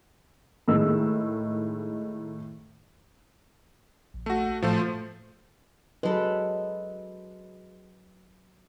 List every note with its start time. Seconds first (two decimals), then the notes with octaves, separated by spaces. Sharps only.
0.68 A2 D#3 G#3 E6
4.14 A#1
4.26 A3 F#4
4.62 A2 F3 A3 C5
6.03 F#3 G#3 A4 B4